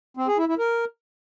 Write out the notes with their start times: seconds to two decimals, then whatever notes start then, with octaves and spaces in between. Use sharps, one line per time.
0.17 C4
0.27 G#4
0.38 E4
0.48 E4
0.59 A#4